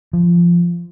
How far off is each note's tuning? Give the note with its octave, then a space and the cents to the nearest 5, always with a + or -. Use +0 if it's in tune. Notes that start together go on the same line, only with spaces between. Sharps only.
F3 -15